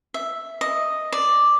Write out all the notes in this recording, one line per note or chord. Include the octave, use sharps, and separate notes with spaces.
E5
D#5
D5